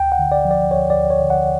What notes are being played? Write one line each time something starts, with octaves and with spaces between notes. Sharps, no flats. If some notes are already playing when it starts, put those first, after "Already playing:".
Already playing: D2 G5
F#5
D3
D5
F3
D5
D2 C#5
D5
D2
C#5
D3
F#5